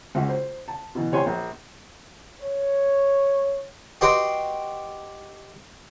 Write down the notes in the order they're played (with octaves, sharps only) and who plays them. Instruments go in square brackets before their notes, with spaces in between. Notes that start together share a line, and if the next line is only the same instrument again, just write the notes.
[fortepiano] C#2 F#4
C5
A5
B2 E3
A2 C3 C#5 G#5 C6
A#1
[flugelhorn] C#5
[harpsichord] F#4 G4 B4 D#5 G5 C6